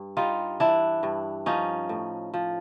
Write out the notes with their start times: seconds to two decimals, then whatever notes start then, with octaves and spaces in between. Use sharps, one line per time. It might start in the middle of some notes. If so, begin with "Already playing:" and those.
Already playing: G2
0.17 G3 D#4 F4
0.60 E3 D4 E4
1.03 G2
1.46 F3 C#4 D#4
1.89 A2
2.34 F3